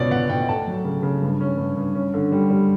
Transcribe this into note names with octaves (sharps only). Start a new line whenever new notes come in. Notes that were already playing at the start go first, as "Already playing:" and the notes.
Already playing: C#2 B2 C#5 D5
B2 F#5
B2 G5
A3 A5
F#3
C#3
C#3
G2
C#4
G2
G2
C#4
D3
G3
G3